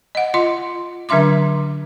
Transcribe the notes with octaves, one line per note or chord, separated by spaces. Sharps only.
D#5 F#5
F4 D#5 C6
D3 F#3 D4 E5 C6 D6